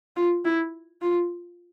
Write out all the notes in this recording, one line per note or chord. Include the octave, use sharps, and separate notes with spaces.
F4
E4
F4